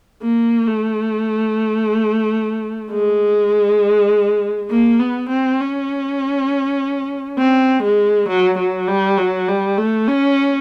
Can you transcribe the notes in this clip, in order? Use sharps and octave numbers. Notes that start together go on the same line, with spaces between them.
A#3
A3
G#3
A#3
B3
C4
C#4
C4
G#3
F#3
F#3
G3
F#3
G3
A3
C#4